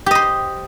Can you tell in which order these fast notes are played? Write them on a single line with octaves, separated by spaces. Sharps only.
G4 D#5 C5